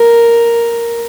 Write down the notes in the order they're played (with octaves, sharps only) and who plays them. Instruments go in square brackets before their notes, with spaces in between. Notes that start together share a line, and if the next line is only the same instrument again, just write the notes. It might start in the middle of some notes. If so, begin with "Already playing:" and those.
Already playing: [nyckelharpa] A#4